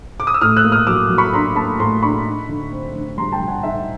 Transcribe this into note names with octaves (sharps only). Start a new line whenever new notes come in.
D6
D#6
E6
A2 D#6 F6
E6 F#6
A#3
D#6 F6
F#3 D6 E6
F#3
B5 C#6
D4 A#5 C6
A#3 A5 B5
A2 A#5 C6
D4 B5 C#6
D#4
D3
C4
D3
G3 A#5 C6
G5 A5
G3
F#5 G#5
D#4 E5 F#5